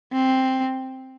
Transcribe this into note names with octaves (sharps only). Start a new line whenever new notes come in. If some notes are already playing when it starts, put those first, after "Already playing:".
C4